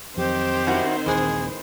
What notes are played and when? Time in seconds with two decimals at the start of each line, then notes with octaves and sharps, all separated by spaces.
0.17 F2 D#3 F3 F#3 C4 G4 C5
0.67 C#4 E4 F#4
1.06 A#1 D#2 E3 G#3 G#4